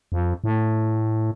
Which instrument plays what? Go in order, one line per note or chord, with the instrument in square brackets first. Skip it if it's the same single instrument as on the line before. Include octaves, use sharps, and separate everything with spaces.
[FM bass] F2
A2